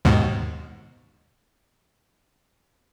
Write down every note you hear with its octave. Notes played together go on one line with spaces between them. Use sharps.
D#2 G#2 B2